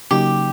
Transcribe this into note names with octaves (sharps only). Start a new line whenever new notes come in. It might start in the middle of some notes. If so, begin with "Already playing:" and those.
C#3 F#3 A#3 D#4 G4